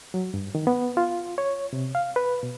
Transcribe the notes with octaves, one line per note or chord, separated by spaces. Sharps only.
F#3
G2
D#3
B3
F4
C#5
C3
F5
B4
B2